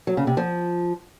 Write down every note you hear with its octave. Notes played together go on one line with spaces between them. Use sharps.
F#3
C#3
C3
F3